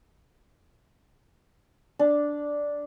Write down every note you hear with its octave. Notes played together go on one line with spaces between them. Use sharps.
D4